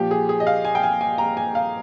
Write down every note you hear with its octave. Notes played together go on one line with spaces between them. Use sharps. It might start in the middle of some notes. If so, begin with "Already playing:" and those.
Already playing: A#2 F3 G4
G#4
G#4
D#5
F5
G#5
G5
G#5
G#5
A#5
G#5
F5